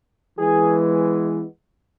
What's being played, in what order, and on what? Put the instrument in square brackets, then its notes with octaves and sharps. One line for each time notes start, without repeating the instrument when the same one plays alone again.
[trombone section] E3 G#3 B3 G#4